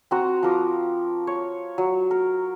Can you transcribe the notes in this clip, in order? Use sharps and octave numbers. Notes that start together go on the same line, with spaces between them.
C4 F#4 A#5
F3 A#4 D6 D#6
C#5
F#3
A#4